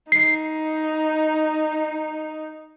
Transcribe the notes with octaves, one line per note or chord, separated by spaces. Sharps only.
D#4 C7